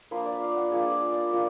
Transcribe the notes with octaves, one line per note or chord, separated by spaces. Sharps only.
F3 A#3 D4 F4 B4
D5
F5
F#5
F3 A#3 D4 F4 G#4
B4
D5
F3 A#3 D4 F4